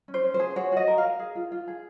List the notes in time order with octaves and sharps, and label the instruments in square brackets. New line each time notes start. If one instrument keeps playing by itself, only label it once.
[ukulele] C#4
C5
C#4
C5
G#4
F#4 C#5
F#4 D#5
A#4
F5
A#4
G#4
F4
F4
G#4